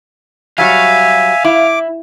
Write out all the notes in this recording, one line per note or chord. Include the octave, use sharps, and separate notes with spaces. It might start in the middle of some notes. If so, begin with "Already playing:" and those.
F#3 G3 E5 F5 G#5
E4 D6